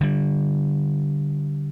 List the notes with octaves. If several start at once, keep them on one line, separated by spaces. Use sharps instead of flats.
D3 G3